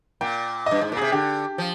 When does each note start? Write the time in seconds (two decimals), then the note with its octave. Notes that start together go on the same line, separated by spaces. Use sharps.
0.21 A#2 G5
0.66 G2 D#5
0.81 G#2
0.92 A#2
0.97 C3 G#4
1.12 D3 G4
1.58 F3